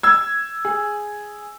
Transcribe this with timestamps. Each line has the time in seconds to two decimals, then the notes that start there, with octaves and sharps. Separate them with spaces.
0.03 E6 G#6
0.65 G#4